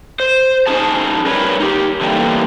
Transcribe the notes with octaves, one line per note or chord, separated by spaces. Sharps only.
C5
C#4 D#4 G#4 A5
G3 A#4 B4 C#5
D#4 G4
D3 E3 G3 A3 A#3